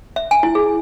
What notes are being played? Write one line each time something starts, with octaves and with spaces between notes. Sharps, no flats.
E5
G#5
E4
G#4